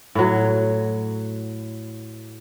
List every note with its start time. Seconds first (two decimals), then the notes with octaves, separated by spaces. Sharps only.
0.15 A2 F#3